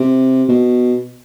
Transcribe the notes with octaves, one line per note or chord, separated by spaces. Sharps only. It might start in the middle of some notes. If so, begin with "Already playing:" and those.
Already playing: C3
B2